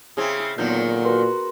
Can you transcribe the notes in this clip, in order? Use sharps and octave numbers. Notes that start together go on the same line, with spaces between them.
C#3 C4 E4 G#4 D#6
A#2 D3 D#3 F#3 B3 G6
F#4 A#4 B4 C6